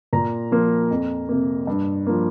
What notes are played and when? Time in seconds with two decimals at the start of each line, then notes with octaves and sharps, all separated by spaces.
0.13 A#2 A#5
0.51 F3 A#3
0.90 F2
1.29 C3 A#3
1.67 G2
2.07 F3 A#3